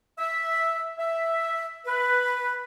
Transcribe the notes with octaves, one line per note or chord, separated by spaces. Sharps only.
E5
E5
B4